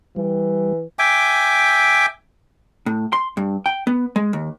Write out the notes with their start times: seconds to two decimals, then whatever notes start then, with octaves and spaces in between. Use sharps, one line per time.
0.16 E3 G3
0.99 E5 G5 G#5 D6
2.86 A2
3.13 C6
3.37 G2
3.66 G5
3.87 B3
4.16 G#3
4.33 D#2